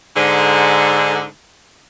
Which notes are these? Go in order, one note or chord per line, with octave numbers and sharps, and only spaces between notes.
G#2 D3